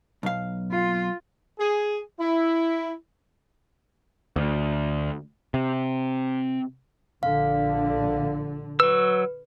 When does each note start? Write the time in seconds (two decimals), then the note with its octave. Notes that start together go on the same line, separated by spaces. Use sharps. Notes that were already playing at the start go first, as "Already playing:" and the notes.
0.23 B1 F5
0.72 F4
1.59 G#4
2.19 E4
4.36 D2
5.54 C3
7.23 A#1 D3 F5
8.80 F#3 B4 E6